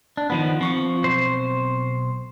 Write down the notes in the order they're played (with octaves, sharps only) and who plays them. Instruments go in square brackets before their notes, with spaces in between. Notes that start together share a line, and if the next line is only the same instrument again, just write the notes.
[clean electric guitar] D4
D#3 F3 B3
[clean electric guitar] F3 [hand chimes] C4 C#6 C#7
[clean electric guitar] B1 C5